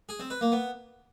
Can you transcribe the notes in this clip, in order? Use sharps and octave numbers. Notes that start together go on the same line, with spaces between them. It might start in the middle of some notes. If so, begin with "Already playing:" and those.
G#4
C4
B4
A#3
B3